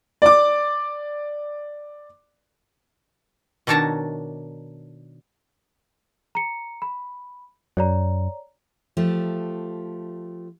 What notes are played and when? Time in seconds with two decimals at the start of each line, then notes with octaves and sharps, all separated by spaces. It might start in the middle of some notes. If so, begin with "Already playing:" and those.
0.22 D5 D6
3.67 B2 D#3 D4 C#5 A5 A#5
6.35 A#5 C#7
6.82 B5
7.77 F#2 C#5 D5 A#5
8.97 F3 A3 G4